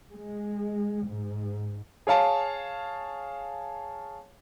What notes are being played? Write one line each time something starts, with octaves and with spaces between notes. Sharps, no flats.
G#3
G#2
G#4 C#5 F5 A5